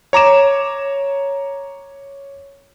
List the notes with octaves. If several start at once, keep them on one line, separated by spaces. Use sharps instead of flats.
C#5 A#5 D6 E7